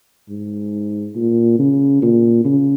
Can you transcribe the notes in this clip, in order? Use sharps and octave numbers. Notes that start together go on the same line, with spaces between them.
G#2
A#2
C#3
A#2
C#3